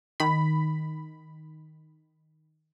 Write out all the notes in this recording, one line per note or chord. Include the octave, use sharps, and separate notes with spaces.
D#3 B5